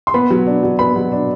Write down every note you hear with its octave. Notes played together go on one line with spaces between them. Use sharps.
C6
B3 B5
F#3
D4
F#3
B3 B5
F#3
D4